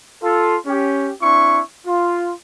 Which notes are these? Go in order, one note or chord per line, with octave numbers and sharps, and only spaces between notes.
F4 A4
C#4 G4
C4 D4 E4 C#6
F4